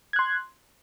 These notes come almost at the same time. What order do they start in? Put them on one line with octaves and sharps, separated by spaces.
G#6 F#6 C6